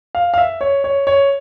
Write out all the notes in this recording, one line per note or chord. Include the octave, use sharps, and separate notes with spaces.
F5
F5
E5
C#5
C#5
C#5